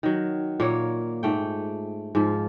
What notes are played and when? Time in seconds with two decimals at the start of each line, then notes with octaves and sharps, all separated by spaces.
0.03 D#3 F#3
0.60 A#2 A#3 C#5
1.23 G#2 A3 G5
2.15 G#2 F3